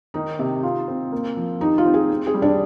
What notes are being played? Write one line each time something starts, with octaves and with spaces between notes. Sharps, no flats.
D#3 D#4
C3
F4
C4
A#3
F3
D#4 G4
F4
C4
G#4
C4
G#4
G3
D4